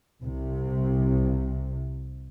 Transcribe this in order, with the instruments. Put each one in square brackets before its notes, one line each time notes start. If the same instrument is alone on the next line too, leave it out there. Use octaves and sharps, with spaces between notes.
[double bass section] C2 C3